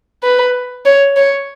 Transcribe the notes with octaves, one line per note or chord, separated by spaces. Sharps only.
B4
C#5
C#5